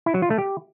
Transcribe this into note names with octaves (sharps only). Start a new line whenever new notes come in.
E4
F#3
F4
A3
G4